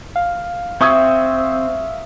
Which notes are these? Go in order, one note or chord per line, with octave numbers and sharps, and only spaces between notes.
F5
C4 E5 C#6 D#6 G#6